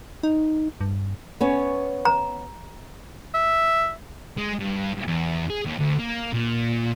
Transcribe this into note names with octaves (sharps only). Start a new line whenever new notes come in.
D#4
G2
B3 C#4 C#5
A#5
E5
G#3
G2
E2
G#4
D#2
D2
A#3
A#2